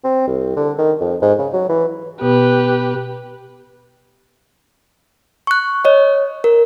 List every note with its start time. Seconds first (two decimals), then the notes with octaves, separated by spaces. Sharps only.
0.04 C4
0.27 C2
0.57 D3
0.78 D#3
1.01 F2
1.22 G#2
1.39 C#3
1.53 F#3
1.69 E3
2.21 B2 B3 G4 B4
5.47 C#6 F#6
5.85 C#5 D#5
6.44 A#4